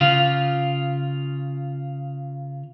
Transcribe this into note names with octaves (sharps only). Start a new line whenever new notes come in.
C#3 F4